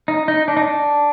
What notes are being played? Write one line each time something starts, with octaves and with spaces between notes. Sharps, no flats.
D#4
D#4
D4
D#4
D4